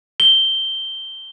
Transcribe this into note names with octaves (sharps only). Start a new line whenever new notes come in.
G7